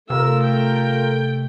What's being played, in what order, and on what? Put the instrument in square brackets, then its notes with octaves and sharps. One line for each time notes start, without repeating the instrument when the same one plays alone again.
[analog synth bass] C3 [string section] A3 [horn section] F4 A#4 [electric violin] E6
[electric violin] G5